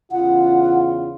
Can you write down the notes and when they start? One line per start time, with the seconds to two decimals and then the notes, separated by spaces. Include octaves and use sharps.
0.11 E2 C#3 F4 F#5